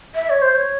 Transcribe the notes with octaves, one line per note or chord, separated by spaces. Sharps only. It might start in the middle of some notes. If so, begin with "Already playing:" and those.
E5
C#5
C5
C#5